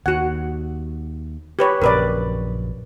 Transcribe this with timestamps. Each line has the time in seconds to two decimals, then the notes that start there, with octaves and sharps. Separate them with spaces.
0.06 D#2 F#4 F#5
1.59 G4 B4 C#5
1.82 A#1 F#2 C#3 A#4 B4 D5